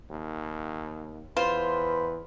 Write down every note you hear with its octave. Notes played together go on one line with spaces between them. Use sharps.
D#2
E2 F4 B4 C5